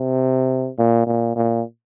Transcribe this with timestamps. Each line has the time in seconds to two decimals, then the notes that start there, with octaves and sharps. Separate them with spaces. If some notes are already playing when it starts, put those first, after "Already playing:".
Already playing: C3
0.78 A#2
1.07 A#2
1.36 A#2